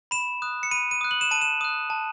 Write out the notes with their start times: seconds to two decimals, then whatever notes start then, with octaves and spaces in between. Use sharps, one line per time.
0.11 B5 E7
0.42 D#6 F#6
0.63 C#7
0.71 B5 D#7
0.91 D#7
1.01 D#6 F#6
1.11 F#7
1.21 E7
1.31 A5 D#7
1.41 E7
1.61 D#6 F#6
1.90 A5